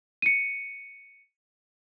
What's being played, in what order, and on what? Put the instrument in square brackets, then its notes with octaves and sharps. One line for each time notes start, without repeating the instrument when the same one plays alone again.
[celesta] C#7 D#7